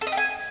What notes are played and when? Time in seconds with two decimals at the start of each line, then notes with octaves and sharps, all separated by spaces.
0.01 A4
0.07 D#5
0.12 G4
0.17 G#5